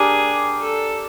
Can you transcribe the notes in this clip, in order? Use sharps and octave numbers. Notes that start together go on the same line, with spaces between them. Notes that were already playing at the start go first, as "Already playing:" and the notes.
Already playing: D4 G4 G#4 A#4
A4